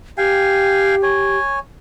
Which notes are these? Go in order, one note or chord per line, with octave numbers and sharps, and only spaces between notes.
G4 F5 G5 G#5
C#5 G#5